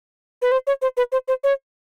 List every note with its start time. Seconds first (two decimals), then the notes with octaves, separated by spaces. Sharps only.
0.42 B4
0.52 C5
0.67 C#5
0.82 C5
0.97 B4
1.12 C5
1.28 C5
1.44 C#5